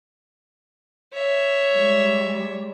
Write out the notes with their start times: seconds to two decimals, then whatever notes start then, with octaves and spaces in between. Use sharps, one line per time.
1.13 C#5 E5
1.72 G3 G#3